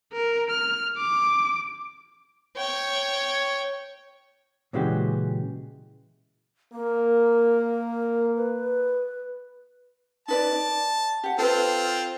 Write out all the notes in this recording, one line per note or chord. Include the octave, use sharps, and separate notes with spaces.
A#4
F6
D6
C#5 G5
A#2 C#3 E3 G#3 F#4 G4
A#3 A#4
B4
D#4 B4 D5 A5
D5
G4 F#5
C4 F4 A4 B4